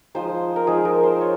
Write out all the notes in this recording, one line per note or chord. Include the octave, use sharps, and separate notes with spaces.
F3 G#3 D#4 C5
A#4
F3 G#3 D#4 G#4
A#4
C5
F4 C#5